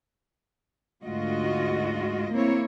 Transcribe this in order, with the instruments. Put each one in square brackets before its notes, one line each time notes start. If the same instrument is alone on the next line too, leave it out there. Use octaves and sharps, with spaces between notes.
[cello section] D2 G#2 F4 F#4 D#5
A#3 C4 E4 C#5